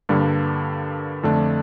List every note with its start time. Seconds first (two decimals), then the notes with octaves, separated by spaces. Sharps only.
0.09 G2 D3 G3 A#3
1.23 F2 D3 A3 D4